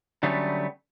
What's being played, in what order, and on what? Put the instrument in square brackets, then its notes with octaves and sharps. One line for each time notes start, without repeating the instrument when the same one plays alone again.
[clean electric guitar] D3 F#3 G3 A3 B3 C#4